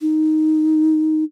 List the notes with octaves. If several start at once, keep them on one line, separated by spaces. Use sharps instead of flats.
D#4